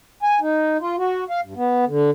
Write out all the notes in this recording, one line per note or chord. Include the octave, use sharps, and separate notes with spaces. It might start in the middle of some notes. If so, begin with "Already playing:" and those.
G#5
D#4
F4
F#4
F5
G2
B3
D3